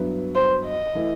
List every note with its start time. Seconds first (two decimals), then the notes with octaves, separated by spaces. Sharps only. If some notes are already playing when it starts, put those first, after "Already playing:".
Already playing: G2 F#3 B3 E4 B4
0.35 C5
0.65 D#5
0.95 E3 A3 E4 B4